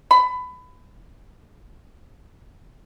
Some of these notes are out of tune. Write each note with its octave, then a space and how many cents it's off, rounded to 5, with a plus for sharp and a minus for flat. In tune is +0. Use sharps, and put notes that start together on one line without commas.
B5 +20